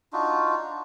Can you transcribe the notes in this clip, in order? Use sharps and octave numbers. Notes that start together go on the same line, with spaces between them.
D4 D#4 F4 F#4